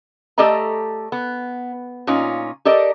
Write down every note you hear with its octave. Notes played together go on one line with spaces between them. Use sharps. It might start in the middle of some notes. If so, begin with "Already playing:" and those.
A3 G4 A4 D5 D#5 A#5
B3
A#2 C#4 D#4 F4
G4 A4 A#4 D5 D#5